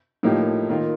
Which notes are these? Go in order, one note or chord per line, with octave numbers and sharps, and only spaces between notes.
A2 F3 A#3 D#4 G4
D#3 A#3 F4